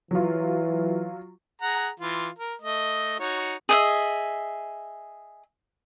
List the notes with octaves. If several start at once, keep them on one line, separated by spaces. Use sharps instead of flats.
E3 F#3 F4
G#4 F#5 A#5
E3 F4
A#4
A3 D#5
D#4 F#4 C#5
G#4 D#5 E5